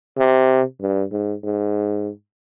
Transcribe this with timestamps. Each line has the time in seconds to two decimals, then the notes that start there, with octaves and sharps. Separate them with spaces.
0.18 C3
0.81 G2
1.12 G#2
1.44 G#2